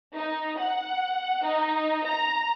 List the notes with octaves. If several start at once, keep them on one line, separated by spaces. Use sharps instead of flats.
D#4
F#5
D#4
A#5